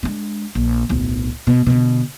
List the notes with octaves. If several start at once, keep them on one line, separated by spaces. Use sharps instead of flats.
G#3 D4
A#1
D1 B1
B2
B2 D3